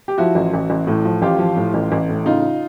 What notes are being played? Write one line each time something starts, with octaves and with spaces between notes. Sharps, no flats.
G4
F3 E4 F#4
A1
A1
A1
A2
F3
A1 F4 G4
F3
A2
A1
A1
A2
C#3 D#4 F4